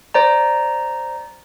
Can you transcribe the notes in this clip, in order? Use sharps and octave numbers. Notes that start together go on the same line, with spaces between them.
C5 D5 A#5